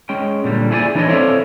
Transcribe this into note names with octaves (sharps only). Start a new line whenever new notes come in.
G#3 C#4 G5
A#2 D3 G3
E4 G#4 B4 C#5 D5 G#5
E3 D4 E4 A4 C#5 D#5
C4 A4 C#5 D5 E5 F5